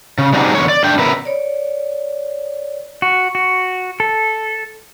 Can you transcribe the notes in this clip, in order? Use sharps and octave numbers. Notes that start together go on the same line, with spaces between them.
C#3
G3 C4 D4 D#4 F#4 G#4
E2 A#2 D3 C#5
D5
A3 D4 G5
C#3 B3 A#4 B4 E5
C#5 D5
F#4
F#4
A4